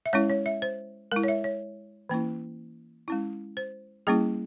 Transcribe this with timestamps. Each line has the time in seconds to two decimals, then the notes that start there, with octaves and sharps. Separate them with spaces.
0.06 E5
0.13 G#3 C#4 E4 C#5
0.30 C#5
0.46 E5
0.62 C5
1.12 G#3 E4 A#4
1.24 C#5
1.28 E5
1.44 C#5
2.09 E3 A#3 C#4 E4
3.08 G#3 C#4 E4
3.57 C5
4.07 G3 A#3 C#4 E4 G#4